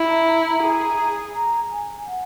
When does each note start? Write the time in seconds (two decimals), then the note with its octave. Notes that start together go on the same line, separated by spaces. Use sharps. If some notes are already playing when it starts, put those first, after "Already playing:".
Already playing: E4
0.09 A#5
0.28 A#5
0.45 A#5
0.63 G#4
1.35 A#5
1.71 G#5
2.07 F#5